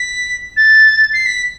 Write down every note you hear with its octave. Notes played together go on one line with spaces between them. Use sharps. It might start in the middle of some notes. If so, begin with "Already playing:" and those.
Already playing: B6
A6
C7
B6